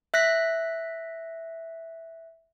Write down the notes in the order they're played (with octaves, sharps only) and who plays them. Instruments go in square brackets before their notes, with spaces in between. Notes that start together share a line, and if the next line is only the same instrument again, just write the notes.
[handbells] E5 F#6 A#6 B6